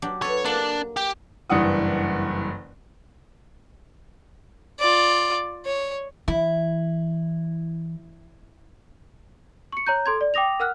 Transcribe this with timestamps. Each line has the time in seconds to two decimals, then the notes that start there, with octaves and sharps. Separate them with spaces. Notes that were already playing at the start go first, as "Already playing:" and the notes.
0.02 F#3 D4 G4
0.22 A4 B4 C#5
0.45 A#3 D4 F#5
0.97 G4 G5
1.50 F#1 G2 E3 F#5 D#6
4.80 F4 D5
5.66 C#5
6.28 E3 E4
9.72 C#6 C#7
9.87 C#5 A#5 G6
10.06 A4 C6 G#6
10.21 D5
10.34 G5 D6 D#6 A#6 F7
10.60 A#4 F#5 F6 F#6